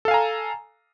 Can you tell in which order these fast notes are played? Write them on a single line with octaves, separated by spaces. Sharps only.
A4 F5 G#5 A#5